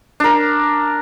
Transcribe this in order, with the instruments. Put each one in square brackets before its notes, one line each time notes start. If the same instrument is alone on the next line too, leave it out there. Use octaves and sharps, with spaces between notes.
[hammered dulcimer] D4 A#4